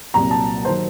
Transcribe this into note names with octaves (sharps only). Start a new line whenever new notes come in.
C2 A#2 F#3 A#5
A5
D#3 F#3 C5